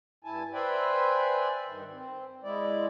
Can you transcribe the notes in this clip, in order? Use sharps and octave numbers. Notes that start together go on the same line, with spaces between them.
G2 E4 G#5 A5
B4 C5 D5 E5 G5 G#5
G2 D#3
C4
G#3 E4 D5